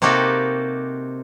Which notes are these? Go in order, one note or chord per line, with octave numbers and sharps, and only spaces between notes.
C3 A#3 D#4 F#4 G4 A4